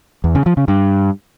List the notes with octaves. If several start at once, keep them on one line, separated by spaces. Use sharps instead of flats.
E2
C#3
F3
C#3
G2